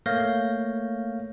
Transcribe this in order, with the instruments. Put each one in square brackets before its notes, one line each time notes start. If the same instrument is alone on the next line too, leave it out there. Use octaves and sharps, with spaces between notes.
[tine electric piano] A3 A#3 C#5 F5 G6 A#6